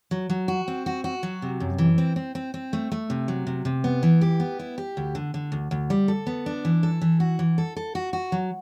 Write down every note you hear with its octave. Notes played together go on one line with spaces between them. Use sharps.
F#3
F#3
F#4
C4
F#4
F#4
F#3
C3
F#2
E3
C4
C4
C4
C4
A3
A3
C3
F#3
C3
C3
B3
E3
G4
B3
E4
G4
D2
D3
D3
D2
D2
G3
A4
B3
D4
E3
A4
E3
F#4
E3
A4
A4
F#4
F#4
F#3